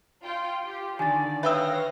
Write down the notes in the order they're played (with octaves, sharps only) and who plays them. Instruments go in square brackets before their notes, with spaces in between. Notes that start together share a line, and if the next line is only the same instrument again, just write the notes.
[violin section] F4 G5
F4 G4
[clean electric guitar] D3 D#3 [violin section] D5 [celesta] G#5 A6
[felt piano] B4 G5 E6 [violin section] C#5 F5 A#6 [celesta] E5 D#6